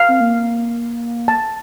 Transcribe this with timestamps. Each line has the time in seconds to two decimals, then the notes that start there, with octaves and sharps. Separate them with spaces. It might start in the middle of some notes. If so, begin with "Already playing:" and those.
Already playing: F5
0.08 C4
0.20 A#3
1.28 A5